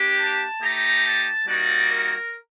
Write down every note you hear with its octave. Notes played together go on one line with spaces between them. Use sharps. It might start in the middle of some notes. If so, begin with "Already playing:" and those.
Already playing: A#3 D4 G4
A5
A3 D#4 G4 A#5
A5
G3 A#3 D#4 F#4 D5
A#4